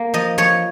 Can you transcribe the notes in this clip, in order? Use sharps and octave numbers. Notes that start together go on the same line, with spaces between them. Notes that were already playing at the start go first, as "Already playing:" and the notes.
Already playing: A#3
F3 D#5
F3 C#5